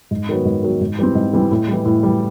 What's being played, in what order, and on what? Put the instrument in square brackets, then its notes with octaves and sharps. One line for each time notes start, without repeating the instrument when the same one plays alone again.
[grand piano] G#2
D#3 F#3 B3
G#2
D#3 F#3 B3
G#2
E3 G3 C4
G#2
E3 G3 C4
A2
E3 G3
A2
E3 G3